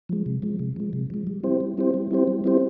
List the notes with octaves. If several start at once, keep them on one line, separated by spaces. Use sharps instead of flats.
F3 G#3
C3
F3 G#3
C3
F3 G#3
C3
F3 G#3
G3
C4 E4 G4 C5
G3
C4 E4 G4 C5
G3
C4 E4 G4 C5
G3
C4 E4 G4 C5